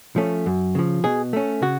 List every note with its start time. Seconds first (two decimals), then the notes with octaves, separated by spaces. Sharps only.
0.16 F3 A3 C#4
0.46 F#2
0.75 C#3 F3
1.04 B2 G#4
1.33 A3 C#4
1.62 C#3 F#4